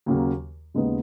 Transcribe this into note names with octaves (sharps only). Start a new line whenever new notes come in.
D#2 C#3 F#3 A#3
D#2 C#3 G#3 B3 D#4